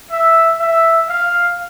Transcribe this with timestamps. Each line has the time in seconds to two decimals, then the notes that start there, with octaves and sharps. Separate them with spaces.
0.11 E5
0.59 E5
1.09 F5